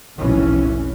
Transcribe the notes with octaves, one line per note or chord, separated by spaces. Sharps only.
F1 B1 A2 E3 C#4